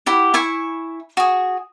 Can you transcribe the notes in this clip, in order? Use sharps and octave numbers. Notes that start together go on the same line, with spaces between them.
E4 G4 F#5
E4 E5 G#5 C#6
F#4 G#4